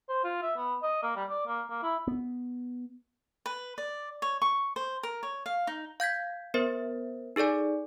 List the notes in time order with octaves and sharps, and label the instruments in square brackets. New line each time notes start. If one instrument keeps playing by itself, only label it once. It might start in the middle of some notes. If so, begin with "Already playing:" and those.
[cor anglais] C5
F4
E5
B3
D#5
A#3
G3
D5
A#3
A#3
E4
[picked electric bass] B3
[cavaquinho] B4
D5
C#5
C#6
C5
A#4
C#5
F5
D#4
[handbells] F5 G6 G#6 B6
B3 A#4 C5 E5
D#4 G#4 A4 D5 G#5